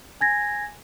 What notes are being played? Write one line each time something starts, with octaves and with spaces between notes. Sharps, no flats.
G#5 G#6 A#6